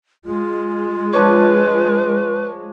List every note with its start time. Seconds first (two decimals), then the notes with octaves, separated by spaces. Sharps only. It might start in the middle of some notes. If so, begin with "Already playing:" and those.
0.25 G#3 F4
1.13 F3 D4 B4 C#5